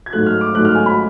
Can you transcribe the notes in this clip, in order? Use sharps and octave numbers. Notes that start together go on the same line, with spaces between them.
G#6
G#2 F#3 A3 F#6
F6
D6
G#2 F#3 A3 F#6
F6
G#5
B5